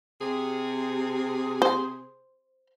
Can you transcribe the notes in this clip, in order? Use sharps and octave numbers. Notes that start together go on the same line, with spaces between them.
C3 G#4
C5